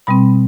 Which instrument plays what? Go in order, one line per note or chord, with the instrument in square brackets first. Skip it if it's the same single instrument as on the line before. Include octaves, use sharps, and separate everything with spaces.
[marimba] B2 G3 C4 B5